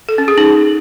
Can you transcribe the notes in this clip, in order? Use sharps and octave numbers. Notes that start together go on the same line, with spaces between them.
A4
C#4
G#4
D#4